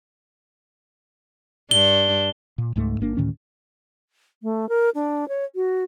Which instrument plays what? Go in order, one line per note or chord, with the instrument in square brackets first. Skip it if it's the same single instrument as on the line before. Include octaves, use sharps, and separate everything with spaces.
[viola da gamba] G2 D4 [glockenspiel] G7
[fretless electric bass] A#2
C#2 G#2 A3
G1 A#3 D4
D2 A2 D#3 C#4
[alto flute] A3
A#4
D4
C#5
F#4